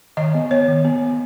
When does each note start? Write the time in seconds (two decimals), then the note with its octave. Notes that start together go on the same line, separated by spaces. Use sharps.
0.17 D#3 D#5
0.34 B3
0.51 B3 C#5
0.68 D#3
0.85 B3
1.02 B3